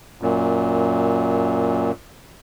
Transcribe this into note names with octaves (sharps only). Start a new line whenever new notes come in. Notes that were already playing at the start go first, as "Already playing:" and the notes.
F#2 A#2